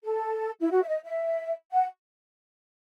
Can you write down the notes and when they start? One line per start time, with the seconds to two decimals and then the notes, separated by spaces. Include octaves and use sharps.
0.04 A4
0.61 E4
0.71 F#4
0.82 E5
0.88 D#5
1.04 E5
1.72 F#5